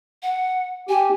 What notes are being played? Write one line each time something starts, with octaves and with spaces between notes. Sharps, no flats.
F#5
G4 G#5